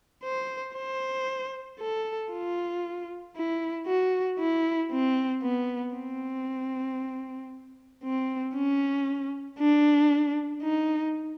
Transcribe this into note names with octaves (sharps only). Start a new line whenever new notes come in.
C5
C5
A4
F4
E4
F#4
E4
C4
B3
C4
C4
C#4
D4
D#4